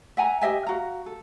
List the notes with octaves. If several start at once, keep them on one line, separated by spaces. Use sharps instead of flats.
E5 F#5 G#5 A#5
G4 D#5 E5 G#5
F#4 F5 A#5
A4